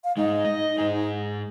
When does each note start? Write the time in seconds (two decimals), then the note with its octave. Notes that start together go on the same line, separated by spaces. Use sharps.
0.04 F5
0.17 G#2 G#3 D#4
0.45 D#5
0.78 G#2 G#4